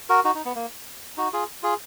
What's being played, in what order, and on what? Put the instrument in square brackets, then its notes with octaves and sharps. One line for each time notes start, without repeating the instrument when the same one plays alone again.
[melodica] F#4 A#4
D#4 F#4
D#4
B3
A#3
D#4 F#4
F4 G#4
F4 G#4